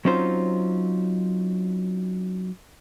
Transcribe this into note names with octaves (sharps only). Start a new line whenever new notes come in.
F#3 C4 C#4 D#4 F4 C5